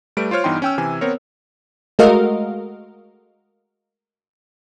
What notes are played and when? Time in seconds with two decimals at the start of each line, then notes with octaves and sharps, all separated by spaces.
0.17 G3 A3 B4 D7
0.31 F4 C5 C#5 F6
0.44 G2 E3 B3 D#4 G5 C6
0.62 C#4 G5 E6
0.78 C3 E3 G#5
1.01 B3 C4 A#4 C#5
1.99 G#3 A3 F#4 A#4 D#5 F5